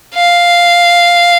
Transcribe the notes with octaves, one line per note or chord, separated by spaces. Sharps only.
F5